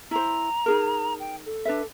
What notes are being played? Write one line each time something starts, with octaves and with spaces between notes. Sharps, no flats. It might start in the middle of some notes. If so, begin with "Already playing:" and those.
E4 C5 A#5
D#4 G#4 A#4
G5
A4
D4 B4 E5